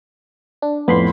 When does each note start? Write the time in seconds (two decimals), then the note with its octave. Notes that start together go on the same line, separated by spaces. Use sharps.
0.62 D4
0.88 F2 A2 B3 B5 C6